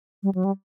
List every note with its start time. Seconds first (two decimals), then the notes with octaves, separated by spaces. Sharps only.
0.23 G3
0.35 F#3
0.45 G3